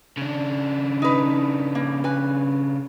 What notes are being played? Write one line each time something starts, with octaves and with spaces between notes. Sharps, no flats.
C#3 D4
D#4 B4
A#3
B4 G#5